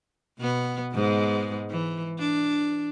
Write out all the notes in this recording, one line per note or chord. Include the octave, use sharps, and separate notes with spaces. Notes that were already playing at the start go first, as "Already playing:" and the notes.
B2 B3
G#2 G#3 B3
E3
D4